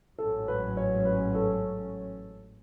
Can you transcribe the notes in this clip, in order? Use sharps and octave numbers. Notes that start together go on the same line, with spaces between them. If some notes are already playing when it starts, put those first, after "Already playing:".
A1 G#2 F#3 C#4 A4
B4
C#5
B4
A4